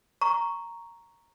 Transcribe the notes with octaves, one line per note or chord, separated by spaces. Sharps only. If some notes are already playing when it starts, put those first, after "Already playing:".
A#5 C#6